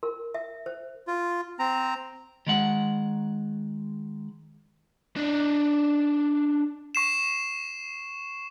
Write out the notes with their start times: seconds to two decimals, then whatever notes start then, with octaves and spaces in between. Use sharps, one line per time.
0.03 A#4
0.34 E5
0.66 C5
1.07 F4
1.59 C4 A#5
2.47 D#3 G#3 F#5
5.16 D4 D#4
6.95 C#6 C7 E7